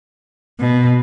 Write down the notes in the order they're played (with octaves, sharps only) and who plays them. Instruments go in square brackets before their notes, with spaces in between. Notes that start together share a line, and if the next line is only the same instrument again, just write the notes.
[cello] B2